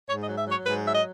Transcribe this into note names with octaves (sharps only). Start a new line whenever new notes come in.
G#2 C#5
D#5
F#3
E5
F#3 C#5
G#2 B4
F#3 E5
D#5